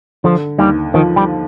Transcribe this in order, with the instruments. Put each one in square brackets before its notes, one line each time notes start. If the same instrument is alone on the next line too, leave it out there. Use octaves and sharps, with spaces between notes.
[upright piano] D3 [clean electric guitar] F3
[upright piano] D#2 [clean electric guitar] G3
[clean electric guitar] D#3 [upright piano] F3
[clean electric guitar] G3